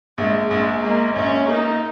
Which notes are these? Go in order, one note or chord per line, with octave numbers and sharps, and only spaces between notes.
A#1 G#3
A#1 G#3
G#3 A#3
A#1 C#4
A#3 D#4